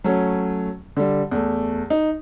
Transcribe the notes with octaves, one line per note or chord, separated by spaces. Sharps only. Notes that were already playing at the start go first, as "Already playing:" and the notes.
F#3 A3 C#4
D3 G3
E2 A3
D#4